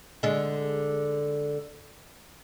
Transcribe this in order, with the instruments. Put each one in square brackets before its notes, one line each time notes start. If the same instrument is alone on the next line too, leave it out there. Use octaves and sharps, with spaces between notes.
[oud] D3 G#3